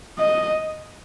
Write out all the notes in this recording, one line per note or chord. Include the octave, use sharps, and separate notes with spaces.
D#5